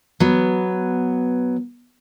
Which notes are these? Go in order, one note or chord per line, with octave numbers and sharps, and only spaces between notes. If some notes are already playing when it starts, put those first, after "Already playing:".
F#3 B3